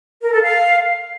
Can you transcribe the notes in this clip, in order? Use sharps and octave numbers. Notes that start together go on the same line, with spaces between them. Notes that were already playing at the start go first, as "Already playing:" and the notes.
A#4
A4
F5